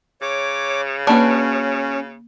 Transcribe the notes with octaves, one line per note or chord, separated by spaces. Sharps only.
C#3 C#5 D6
A#3 C#4 D4 F#4 B4 A5